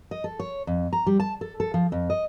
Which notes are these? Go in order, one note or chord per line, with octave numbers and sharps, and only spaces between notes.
D#5
A4
C#5
F2
A#5
G3
A5
A4
A4
F3
F2
D#5